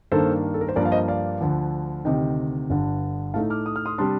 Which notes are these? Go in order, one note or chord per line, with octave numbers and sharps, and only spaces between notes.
G2 D#3 A#3 D4 A4 C5
A4
A#4
C5
G2 F3 A#3 A#4 D5
F5
C5 D#5
D5 F5
D2 D3 F3
D2 C3 D#3 D#5 G5
G1 G2 D3
A2 A3 D#4 F5 A5
D6 F6
D#6
F6
C6 D#6
C3 G3 D4 A5 C6